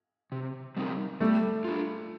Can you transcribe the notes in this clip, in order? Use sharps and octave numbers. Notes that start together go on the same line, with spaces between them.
C3
G3 C4 D#4 A#4
G3 A3
D4 F4